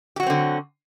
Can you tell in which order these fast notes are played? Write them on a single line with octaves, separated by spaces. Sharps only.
G4 F#4 F#3 C4 D3